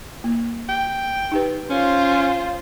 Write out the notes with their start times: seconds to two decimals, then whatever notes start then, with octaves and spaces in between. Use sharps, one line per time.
0.24 A#3
0.69 G5
1.32 D#4 G4 B4
1.70 C#4 F4 C5